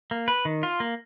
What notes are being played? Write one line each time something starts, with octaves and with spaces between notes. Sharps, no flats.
A#3
B4
D#3
F4
A#3